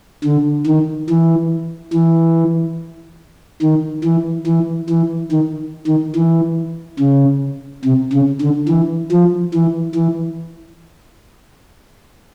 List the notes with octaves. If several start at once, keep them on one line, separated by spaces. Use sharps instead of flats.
D3
D#3
E3
E3
D#3
E3
E3
E3
D#3
D#3
E3
C#3
C3
C#3
D3
E3
F3
E3
E3